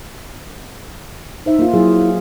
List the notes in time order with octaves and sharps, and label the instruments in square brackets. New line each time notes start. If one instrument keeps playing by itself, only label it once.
[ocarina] D#4 [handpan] C5 E5
[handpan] A#3 F4
[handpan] F#3 G#4 [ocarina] E4